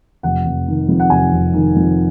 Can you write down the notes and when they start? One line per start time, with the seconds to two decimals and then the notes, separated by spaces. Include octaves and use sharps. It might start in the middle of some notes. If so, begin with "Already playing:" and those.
0.23 F1 F#5
0.45 F1
0.68 D#3
0.88 F2
1.00 F#5
1.10 F1 G#5
1.32 F1
1.53 D#3
1.76 F2